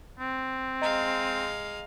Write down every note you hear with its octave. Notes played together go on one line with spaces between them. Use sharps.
C4
G#3 D#5 F5 A#5